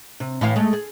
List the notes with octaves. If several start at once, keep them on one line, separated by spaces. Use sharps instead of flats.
C3
A2 E3 F5
G#3 A3
G#4